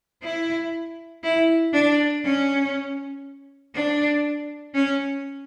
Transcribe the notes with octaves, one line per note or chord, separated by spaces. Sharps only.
E4
E4
D4
C#4
D4
C#4